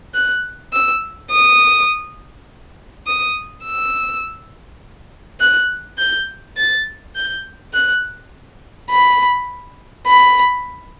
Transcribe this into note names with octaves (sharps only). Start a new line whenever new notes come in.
F#6
E6
D#6
D#6
E6
F#6
G6
A6
G6
F#6
B5
B5